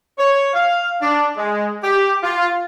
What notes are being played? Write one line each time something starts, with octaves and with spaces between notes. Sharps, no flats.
C#5
F5
D4
G#3
G4
F4